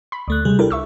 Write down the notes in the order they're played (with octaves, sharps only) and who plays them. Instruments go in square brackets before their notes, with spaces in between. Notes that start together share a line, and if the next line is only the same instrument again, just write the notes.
[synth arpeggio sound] B5
[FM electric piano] D2 A3 F#6
[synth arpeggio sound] C3 [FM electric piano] G3 G#4
[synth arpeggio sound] D4 E4 A#4 [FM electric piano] G4 A4
[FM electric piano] C#2 [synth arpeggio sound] E5 C#6 E6